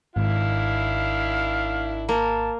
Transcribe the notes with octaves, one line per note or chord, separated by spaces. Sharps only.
G#1 D#3 D4 E4 F5
A#3 A5